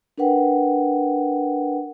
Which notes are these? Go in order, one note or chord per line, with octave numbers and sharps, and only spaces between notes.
D4 A#4 B4 F#5 G5